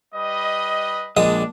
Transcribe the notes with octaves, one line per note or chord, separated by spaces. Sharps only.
G3 B4 D#5
A#1 G#3 D4 D#5 D#6